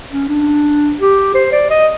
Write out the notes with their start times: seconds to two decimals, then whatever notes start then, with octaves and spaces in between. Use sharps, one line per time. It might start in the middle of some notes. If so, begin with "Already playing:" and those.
0.11 C#4
0.29 D4
0.99 G4
1.34 C5
1.52 D5
1.70 D#5